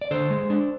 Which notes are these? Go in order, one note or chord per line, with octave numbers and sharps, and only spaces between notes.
D5
D3 A4 C5
G#3
D4